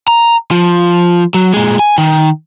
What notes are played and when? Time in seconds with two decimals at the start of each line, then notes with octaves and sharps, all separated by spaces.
0.08 A#5
0.51 F3
1.34 F#3
1.54 A#2 G#3
1.79 G#5
1.98 D#3